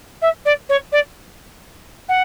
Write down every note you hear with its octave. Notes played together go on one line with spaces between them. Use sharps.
E5
D5
C#5
D5
F#5